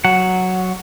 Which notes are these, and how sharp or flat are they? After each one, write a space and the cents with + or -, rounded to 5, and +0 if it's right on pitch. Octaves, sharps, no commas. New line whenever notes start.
F#3 +0 F#5 +0